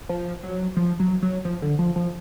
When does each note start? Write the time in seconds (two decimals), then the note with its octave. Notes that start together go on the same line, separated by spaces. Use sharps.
0.09 F3
0.43 F#3
0.77 F3
1.00 F#3
1.22 F#3
1.45 F3
1.62 D3
1.79 F3
1.96 F3